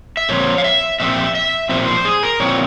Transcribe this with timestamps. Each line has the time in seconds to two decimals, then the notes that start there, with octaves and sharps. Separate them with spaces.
0.17 E5
0.29 A#2 F3 C4 C#5
0.58 F5
0.64 E5
1.00 A#2 F3 C4 E5
1.35 E5
1.69 A#2 F3 C4 E5
1.88 C5
2.05 G#4
2.23 A#4
2.40 A#2 F3 C4 C#5